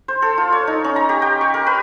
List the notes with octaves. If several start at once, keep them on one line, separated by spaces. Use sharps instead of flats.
C5
A4
F4
C#5
D#4
C#4
A#5
G4
G5
C#6
A#4
B4